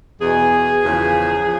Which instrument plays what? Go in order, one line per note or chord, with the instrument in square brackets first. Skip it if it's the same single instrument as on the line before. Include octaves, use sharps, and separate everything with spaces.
[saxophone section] E2 B2 G#4
E2 C#3 F3
F3